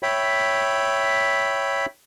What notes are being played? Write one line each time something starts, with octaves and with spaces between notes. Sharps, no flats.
C#5 E5 G5 B5